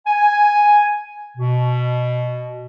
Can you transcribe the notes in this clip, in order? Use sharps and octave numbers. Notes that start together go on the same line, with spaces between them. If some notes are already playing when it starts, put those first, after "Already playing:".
G#5
B2